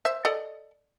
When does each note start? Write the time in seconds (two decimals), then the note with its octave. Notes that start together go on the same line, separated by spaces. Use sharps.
0.05 C5 E5
0.25 A4 D5 D#5